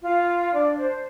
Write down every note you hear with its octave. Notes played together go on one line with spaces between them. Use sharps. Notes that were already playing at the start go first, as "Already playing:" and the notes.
F4 F5
D4 D5
C5